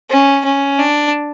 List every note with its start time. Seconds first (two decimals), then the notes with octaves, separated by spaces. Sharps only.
0.10 C#4
0.45 C#4
0.79 D4